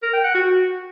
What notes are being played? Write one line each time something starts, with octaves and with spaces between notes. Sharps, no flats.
A#4
G5
F#5
F#4